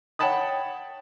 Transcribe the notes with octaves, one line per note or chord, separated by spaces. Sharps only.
C#5 F#5 G5 A5 B5 D#6